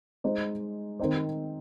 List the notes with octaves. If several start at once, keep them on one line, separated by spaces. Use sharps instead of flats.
G#3 D#4 C5
D#3 C4 D#4 C5